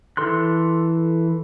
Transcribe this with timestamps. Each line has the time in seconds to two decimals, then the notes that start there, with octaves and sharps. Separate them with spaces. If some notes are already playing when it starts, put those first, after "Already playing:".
0.17 E3 A4 C6 F#6